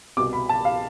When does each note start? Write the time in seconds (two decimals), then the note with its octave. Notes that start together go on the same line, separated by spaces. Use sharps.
0.17 C2 B2 D6
0.33 B5
0.49 A5
0.65 F5